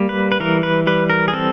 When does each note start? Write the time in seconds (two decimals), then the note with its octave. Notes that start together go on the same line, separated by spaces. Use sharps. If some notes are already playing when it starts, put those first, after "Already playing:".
Already playing: G3 A#3
0.09 B4
0.32 B4
0.40 E3 A#4
0.63 B4
0.87 G3 B4
1.10 A#4
1.28 G#4
1.33 C4 A4